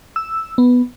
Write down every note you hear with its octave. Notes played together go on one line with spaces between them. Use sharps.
E6
B3